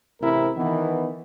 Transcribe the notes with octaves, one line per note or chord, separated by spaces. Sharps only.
A1 C3 C4 E4 A#4
D#3 E3 B3